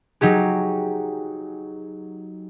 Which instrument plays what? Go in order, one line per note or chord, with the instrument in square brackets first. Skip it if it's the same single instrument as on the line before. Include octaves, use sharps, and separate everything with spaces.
[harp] F#3 D#4 G4 G#4